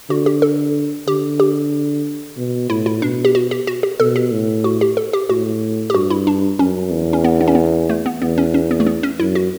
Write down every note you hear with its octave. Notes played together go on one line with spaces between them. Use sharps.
D3 F#4
G4
A4
D3 G4
G4
B2
A2 E4
E4
B2 D4
G4
F#4
G4
F#4
G4
B2 A4
G4
A2
F#4
G4
A4
G4
A2 F#4
G4
G2 F#4
E4
D4
F#2 C#4
E2
C#4
B3
B3
C#4
B3
A3
B3
E2 B3
C#4
C#4
B3
A3
B3
C#4
F#2 E4
F#4